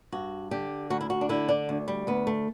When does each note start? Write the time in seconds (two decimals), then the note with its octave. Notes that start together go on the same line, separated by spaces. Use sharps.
0.12 G2 F#4
0.51 D3 G4
0.90 D2 F#4
1.01 E4
1.10 F#4
1.21 D4
1.29 D3 E4
1.49 D4
1.69 D2
1.88 G3
2.07 D2 B3
2.27 A3